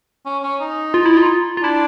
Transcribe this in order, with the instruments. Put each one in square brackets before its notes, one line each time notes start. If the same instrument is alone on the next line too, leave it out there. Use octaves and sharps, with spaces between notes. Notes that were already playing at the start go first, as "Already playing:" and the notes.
[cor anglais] C#4
C#4
D#4
[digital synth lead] F4
E4
F4
F4
[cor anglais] D4 [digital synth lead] E4